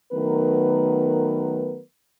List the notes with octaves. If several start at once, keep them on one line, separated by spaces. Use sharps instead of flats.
D#3 F#3 A3 B3 A#4 B4